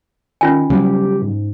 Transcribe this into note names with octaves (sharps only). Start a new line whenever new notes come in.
D#3 C#4 F4 G#5
C#3 F#3 G3 G4
G#2